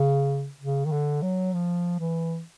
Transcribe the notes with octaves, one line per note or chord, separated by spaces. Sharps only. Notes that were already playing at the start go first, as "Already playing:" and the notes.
Already playing: C#3
C#3
D#3
D3
F#3
F3
E3